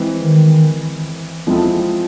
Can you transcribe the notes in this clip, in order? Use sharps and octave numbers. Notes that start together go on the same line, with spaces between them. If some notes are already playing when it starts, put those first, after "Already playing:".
Already playing: E3 G#3 C4
D#3
F3 G#3 C4 E4 A4